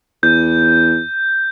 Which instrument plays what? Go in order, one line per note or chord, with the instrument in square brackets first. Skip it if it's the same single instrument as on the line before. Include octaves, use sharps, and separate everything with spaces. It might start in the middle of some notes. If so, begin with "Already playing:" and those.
[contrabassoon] E2 [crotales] G6